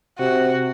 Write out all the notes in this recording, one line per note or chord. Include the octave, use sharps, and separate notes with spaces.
C3 F#4